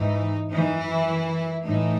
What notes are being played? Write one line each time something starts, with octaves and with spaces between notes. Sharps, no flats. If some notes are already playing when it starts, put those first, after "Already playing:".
Already playing: G#2 E3 D#4
F#2 E3 D#4
E4
A2 E3 D#4